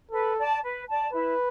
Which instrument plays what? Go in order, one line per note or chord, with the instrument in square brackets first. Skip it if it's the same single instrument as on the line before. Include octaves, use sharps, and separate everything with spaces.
[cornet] A4 [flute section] B4
[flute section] D5 A5
B4
D5 A5
[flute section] E4 [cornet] B4